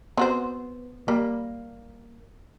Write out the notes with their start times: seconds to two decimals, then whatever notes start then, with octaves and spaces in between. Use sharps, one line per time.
0.17 B3 C4 F#4 C5
1.08 G3 A#3